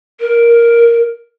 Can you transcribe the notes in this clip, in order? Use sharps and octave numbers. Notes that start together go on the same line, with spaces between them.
A#4